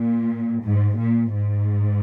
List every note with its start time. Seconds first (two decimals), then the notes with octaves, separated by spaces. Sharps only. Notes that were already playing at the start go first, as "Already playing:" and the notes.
Already playing: A#2
0.62 G#2
0.98 A#2
1.33 G#2